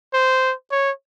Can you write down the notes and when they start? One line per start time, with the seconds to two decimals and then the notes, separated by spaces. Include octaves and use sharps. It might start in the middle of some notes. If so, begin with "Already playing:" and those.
0.14 C5
0.71 C#5